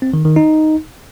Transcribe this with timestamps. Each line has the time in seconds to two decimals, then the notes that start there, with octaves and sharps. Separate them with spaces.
0.02 C4
0.14 D#3
0.25 D#3
0.36 D#4